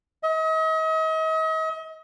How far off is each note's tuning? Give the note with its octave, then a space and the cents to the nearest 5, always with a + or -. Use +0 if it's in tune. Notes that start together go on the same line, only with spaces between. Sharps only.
D#5 +40